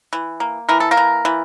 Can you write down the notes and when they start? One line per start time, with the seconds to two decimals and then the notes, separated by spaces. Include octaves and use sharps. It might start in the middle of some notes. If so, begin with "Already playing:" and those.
0.13 E3
0.40 A#3
0.69 E3 A#4
0.80 A4
0.91 A#3 A#4
0.97 E3
1.25 E3